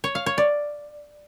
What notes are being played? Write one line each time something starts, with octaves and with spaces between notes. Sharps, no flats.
C#5
F5
C#5
D5